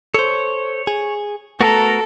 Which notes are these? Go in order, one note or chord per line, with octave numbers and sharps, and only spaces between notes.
A4 C5 C#5
G#4
A3 B3 F#4 A4 A#4 A#5